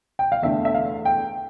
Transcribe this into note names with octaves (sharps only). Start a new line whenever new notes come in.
G5
F5
E2 D3 A3 E5
E5
F5
G5